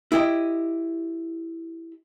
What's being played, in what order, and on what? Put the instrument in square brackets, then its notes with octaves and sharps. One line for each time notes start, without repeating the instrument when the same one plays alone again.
[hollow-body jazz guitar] E4 G4 D#5